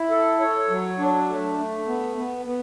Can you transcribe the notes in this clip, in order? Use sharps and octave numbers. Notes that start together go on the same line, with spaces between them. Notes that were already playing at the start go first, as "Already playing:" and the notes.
Already playing: E4
A4
C#5
F#3
D4
A3
A3
B3
B3
B3